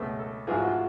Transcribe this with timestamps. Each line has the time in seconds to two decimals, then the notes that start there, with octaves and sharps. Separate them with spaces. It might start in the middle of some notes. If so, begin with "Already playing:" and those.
Already playing: C#2 B2 A3
0.19 A4
0.47 A1 G#2 F3 B3 F4 G#4
0.57 F#4
0.67 F4